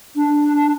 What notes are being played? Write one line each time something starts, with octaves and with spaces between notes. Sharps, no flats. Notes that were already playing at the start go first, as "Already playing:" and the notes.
D4